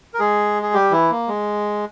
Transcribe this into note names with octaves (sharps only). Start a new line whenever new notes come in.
A#4
G#3 G#4
G#4
G3 G4
E3 E4
A#3
G#3